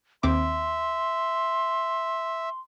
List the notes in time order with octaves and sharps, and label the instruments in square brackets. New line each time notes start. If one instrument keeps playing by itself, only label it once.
[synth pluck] D#2 C4 D6 [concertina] E5 [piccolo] C6